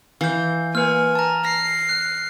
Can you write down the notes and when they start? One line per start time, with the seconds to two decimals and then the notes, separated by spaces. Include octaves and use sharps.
0.21 E3 F5 G6
0.75 A#3 B4 G#5 F6
1.15 A5 A#5
1.45 A#6 C7
1.89 F#6